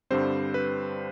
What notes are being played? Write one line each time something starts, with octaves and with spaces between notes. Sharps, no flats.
G2 D3 G3 C4 C5
B4